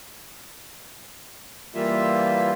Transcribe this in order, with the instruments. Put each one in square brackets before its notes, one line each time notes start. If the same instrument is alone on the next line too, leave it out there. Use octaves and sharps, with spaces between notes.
[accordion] E3 G3 A#3 F4 E5